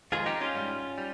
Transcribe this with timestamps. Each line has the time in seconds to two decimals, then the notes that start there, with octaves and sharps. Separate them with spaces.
0.12 F2 D#3 G#3 F4 G#4
0.26 D#4 G4
0.41 C#4 F4
0.55 G#2 G3
0.98 G3